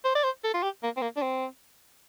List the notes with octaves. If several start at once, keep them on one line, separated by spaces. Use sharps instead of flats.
C5
D5
C5
A4
F4
G4
A#3
C4
A#3
D4
C4